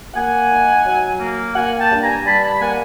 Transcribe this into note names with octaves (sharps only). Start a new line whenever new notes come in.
A#3 F#5 G#5
D#4
F#3
A#3
A#3 F#5 G#5
G5 A5
G2
G#5 A#5
G3 A5 B5
A5 B5
A#3 F#5 G#5